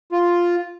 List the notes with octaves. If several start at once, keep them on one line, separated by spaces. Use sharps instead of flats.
F4